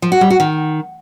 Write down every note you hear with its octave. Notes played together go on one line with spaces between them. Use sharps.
F3
F#4
G3
F#4
D#3